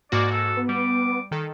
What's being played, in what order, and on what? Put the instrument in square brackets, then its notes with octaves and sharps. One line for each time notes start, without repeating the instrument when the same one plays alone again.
[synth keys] G#2 A#3 F#4 [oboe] D5
[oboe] A4
[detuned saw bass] B3
[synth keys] G3 [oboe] D6
[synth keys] D#3 A4